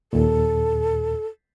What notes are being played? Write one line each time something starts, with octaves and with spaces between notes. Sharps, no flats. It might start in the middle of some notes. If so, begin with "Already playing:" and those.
D#2 A#2 A4